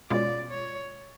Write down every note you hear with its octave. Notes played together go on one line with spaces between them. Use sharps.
B2 G#3 C#4 F4 D5
C#5